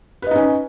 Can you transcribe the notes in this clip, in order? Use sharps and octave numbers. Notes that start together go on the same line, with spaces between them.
C#4 D#4 B4 D#5